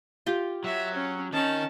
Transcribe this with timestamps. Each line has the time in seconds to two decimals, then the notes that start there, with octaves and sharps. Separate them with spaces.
0.26 F4 G4
0.64 F#3 E5
0.94 C#4
1.33 D#3 C#4 A5